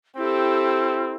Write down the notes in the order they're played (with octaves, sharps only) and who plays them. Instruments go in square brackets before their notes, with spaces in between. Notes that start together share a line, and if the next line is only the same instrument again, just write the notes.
[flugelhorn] C4 [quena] E4 [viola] G4 A4